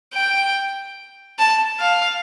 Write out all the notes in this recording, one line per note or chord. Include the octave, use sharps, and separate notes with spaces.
G5
A5
F5